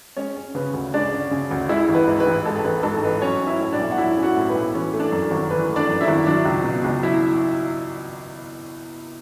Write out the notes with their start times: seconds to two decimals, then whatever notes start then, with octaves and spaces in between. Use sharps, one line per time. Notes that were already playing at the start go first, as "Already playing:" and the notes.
0.17 G#3 C#4 C#5
0.37 C#4
0.55 C#3 B4
0.74 D2
0.94 G#3 D4 D5
1.12 C#4
1.31 C#3
1.51 D2
1.69 G#3 E4 E5
1.89 A1
1.95 B4
2.07 G#2
2.20 B4
2.26 A1
2.45 G#3 A4
2.64 A1 B4
2.83 G#2 A4
3.03 A1 B4
3.22 F#3 C#4 C#5
3.41 C#4
3.47 E4 E5
3.60 A2
3.72 D4 D5
3.79 B1
3.91 F#5
3.98 F#3 E4 E5
4.16 C#4
4.23 F#4 F#5
4.37 A2
4.49 B4
4.55 B1
4.74 E3 C#4 C#5
4.93 A3
5.00 D4 D5
5.12 F#2
5.31 G#1
5.50 E3 B4
5.69 A3
5.76 D4 D5
5.88 F#2
6.01 E4 E5
6.07 G#1
6.26 F#3 D4 D5
6.45 C#2
6.64 B2
6.84 C#2
7.03 F#3 E4 E5